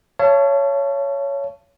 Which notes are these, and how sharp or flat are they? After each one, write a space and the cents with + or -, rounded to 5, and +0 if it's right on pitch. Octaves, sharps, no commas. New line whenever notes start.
C#5 +10 F5 -45 A5 +0